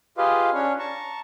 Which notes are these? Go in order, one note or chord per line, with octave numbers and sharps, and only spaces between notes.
F4 G4 G#4 B4 D#5 F5
C#4 D4 C#5
A5 A#5 C#6